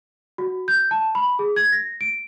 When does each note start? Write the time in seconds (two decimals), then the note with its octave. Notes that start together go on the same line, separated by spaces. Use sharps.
0.38 F#4
0.68 G6
0.91 A5
1.15 B5
1.39 G#4
1.56 G#6
1.72 A#6
2.01 D7